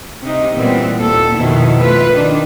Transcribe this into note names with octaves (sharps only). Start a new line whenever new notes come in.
C3 D#4
A#2 E3 G3 B3 C4
D#2 A#2 A4
F2 B2 D#3 E4
A3 F4 B4
D#3 D4